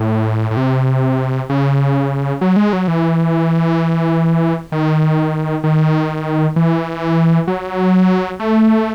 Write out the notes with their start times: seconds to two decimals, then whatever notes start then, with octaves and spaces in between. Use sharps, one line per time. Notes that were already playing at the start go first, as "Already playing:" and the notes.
Already playing: A2
0.51 A2
0.57 C3
1.49 C#3
2.41 F#3
2.56 G#3
2.73 F#3
2.88 E3
4.72 D#3
5.64 D#3
6.56 E3
7.47 F#3
8.40 A3